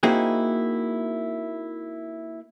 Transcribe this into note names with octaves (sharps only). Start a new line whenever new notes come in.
A#3 C4 D#4 E4 F#4 G#4